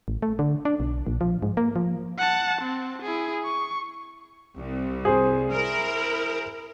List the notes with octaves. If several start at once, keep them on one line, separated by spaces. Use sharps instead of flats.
A1
A3
D3
D4
B1
A#1
F3
G#2
A#3
F3
F#5 A5
C4
E4 G#4
C#6
C2
G#4 C5
E4 A#4